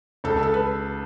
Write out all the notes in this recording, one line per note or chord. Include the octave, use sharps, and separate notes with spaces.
C#2 A4
A4
B4